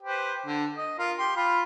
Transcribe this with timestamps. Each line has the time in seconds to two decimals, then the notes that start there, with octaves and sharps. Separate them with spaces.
0.03 G4 B4 C5
0.46 D3
0.77 D#5
0.99 F4 A#4
1.18 G4 C6
1.36 F4 B5